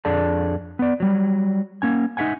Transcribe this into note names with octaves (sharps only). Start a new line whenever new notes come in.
F2 D4 G#4 A4 D5 A5
B3 D5
F#3 G3
A#3 C#4 G#5
D#4 F#4 E5 F#5 G#5